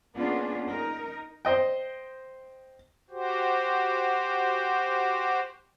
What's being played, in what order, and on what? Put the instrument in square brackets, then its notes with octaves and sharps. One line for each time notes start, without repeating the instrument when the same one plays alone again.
[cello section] A#3 B3 C#4 D4 F4 G#4
D#4 A#4
[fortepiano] C5 D#5 G5
[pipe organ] F#4 G4 C5